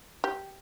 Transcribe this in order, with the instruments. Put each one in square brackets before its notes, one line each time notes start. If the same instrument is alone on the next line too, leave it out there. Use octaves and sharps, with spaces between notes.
[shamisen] G4